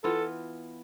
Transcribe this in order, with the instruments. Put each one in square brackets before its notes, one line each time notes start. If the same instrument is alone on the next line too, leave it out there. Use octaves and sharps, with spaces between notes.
[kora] E3 B3 F4 [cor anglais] A4